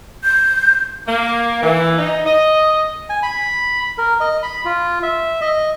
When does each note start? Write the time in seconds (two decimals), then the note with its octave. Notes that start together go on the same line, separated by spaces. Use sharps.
0.24 G6
1.07 A#3
1.63 E3
1.98 D#4
2.26 D#5
3.10 G#5
3.23 B5
3.98 A#4
4.20 D#5
4.43 B5
4.65 F4
5.03 E5
5.41 D#5